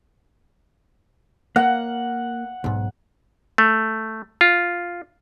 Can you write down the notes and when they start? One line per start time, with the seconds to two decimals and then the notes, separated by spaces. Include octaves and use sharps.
1.56 A#3 F#5
2.64 B1 G#2
3.58 A3
4.41 F4